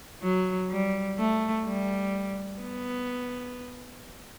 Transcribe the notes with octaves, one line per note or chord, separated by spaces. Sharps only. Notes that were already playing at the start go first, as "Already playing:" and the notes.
F#3
G3
A3
G3
B3